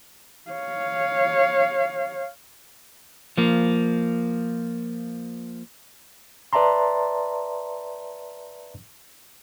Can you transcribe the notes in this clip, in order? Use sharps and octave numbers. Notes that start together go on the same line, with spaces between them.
C#5 F5
F3 A#3
B4 D5 E5 A5 A#5 C6